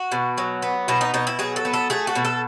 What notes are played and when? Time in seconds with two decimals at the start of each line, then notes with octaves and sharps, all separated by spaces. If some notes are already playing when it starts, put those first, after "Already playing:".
Already playing: F#4
0.12 B2
0.38 F#3
0.62 B3
0.88 B2 E4
1.01 D#4
1.14 B2 D#4
1.27 E4
1.39 F#3 G#4
1.56 A4
1.65 B3
1.73 A4
1.90 A3 G#4
2.07 F#4
2.15 B2
2.25 A4